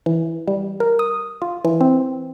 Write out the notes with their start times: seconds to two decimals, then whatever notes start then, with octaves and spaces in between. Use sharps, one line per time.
0.06 E3
0.47 G3
0.80 A#4
0.99 D#6
1.42 F4
1.65 E3
1.81 C4